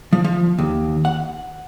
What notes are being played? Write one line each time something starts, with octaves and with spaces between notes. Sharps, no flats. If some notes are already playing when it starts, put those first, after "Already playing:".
F3
F3
D#2
F#5